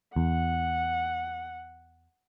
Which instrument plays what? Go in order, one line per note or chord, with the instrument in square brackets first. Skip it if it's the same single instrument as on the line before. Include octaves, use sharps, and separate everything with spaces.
[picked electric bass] E2 [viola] F#5